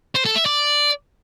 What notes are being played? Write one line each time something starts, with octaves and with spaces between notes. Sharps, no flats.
C5
A4
E5
D5